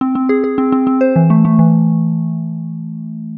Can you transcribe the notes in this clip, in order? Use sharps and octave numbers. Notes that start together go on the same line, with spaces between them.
C4
C4
G#4
G#4
C4
C4
C4
C5
E3
A3
A3
E3